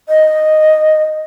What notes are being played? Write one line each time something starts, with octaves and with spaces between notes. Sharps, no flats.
D#5